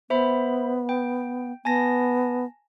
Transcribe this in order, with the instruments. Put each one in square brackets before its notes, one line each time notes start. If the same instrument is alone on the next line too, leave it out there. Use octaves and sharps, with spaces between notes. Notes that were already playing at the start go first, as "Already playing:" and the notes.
[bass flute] B3 [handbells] C5 E5 B5
[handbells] G5
[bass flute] B3 [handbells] G#5 A5 A#6